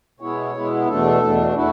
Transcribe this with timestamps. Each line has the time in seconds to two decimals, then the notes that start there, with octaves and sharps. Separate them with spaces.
0.20 B2 G#3 B3 E4 C#5
0.55 B2 G#3 B3 E4
0.87 E2 B2 A3 D4 A4
1.22 E2 B2 A3 D4
1.55 A3 E4 F#4